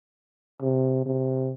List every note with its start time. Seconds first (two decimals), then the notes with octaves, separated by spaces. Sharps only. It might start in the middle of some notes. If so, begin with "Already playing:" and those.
0.62 C3
1.06 C3